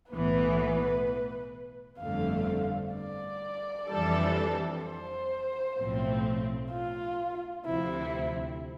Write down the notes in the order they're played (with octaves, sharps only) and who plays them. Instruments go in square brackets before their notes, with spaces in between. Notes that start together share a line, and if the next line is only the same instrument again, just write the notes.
[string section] B1 A2 E3 B3 [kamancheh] B4
[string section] G1 F2 D3 A3 [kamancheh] F5
[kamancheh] D5
[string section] F2 E3 G3 D4 A4
[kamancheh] C5
[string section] B1 A2 F3 C4
[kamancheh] F4
[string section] D2 C3 F3 C4 [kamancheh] E4